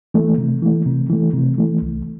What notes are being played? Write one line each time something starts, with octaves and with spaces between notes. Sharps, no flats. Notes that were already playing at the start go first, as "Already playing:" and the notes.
E3 A3
C3
E3 A3
C3
E3 A3
C3
E3 A3
C2